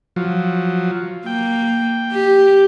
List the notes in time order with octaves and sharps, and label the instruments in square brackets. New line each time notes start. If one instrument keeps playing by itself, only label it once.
[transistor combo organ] F3 F#3
[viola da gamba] A#3 [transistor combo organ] G5
[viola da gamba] G4